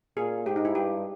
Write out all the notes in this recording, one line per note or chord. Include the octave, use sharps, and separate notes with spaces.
A#2 G#4
G#2 G4
D#4
E4
G2 G4